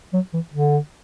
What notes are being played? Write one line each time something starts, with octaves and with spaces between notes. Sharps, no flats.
F#3
E3
D3